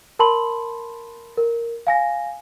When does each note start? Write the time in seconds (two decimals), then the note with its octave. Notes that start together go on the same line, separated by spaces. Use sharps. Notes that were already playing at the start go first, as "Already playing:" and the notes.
0.19 A#4 A5 B5 C6 F#7
1.37 A#4
1.87 F5 G#5 A#6